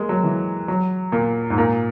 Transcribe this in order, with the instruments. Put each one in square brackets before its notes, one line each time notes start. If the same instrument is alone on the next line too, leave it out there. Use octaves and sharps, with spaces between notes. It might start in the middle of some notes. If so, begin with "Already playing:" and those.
Already playing: [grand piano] G#3 A#3
F#3
E3
F#3
A#2
G#2
A#2